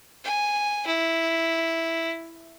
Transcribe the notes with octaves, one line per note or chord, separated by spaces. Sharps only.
G#5
E4